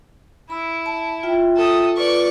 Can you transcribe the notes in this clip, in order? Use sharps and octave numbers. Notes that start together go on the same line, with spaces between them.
E4 B5 E6
A5
F4 E5 G5
A4 D#6
F4 B4 D5 C#6